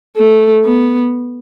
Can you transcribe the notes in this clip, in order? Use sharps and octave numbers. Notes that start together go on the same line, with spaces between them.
A3
B3